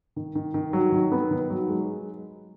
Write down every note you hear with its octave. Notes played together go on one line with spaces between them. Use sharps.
D#3
D#3
D#3
F#3
D#3
B3
D#3
F#3
G#3